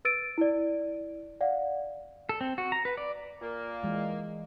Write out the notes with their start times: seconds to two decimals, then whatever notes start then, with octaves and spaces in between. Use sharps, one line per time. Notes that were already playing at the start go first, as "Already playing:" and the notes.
0.05 B4 E6 A6 D7 D#7
0.38 E4 D5
1.41 D5 F5 F#5
2.29 A4
2.41 C4
2.58 F#4
2.72 A#5
2.85 B4
2.97 D5
3.41 A#2 A#3
3.83 E3 G#3